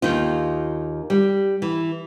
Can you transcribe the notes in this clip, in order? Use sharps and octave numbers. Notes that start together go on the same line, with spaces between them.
D#2 D#4 F4
G3
E3